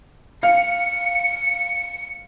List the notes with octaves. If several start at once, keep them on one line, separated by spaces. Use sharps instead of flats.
F5 C#7